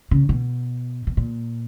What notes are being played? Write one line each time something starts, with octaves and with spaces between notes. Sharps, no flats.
C#3
B2
B2
A#2